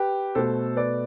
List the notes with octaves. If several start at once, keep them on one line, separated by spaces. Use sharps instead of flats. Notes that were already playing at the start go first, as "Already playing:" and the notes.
Already playing: G4 B4
B2 A3 A4 C5
B4 D5